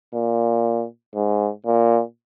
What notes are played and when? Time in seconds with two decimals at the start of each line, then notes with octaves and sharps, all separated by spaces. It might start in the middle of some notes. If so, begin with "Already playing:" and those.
0.14 A#2
1.15 G#2
1.66 A#2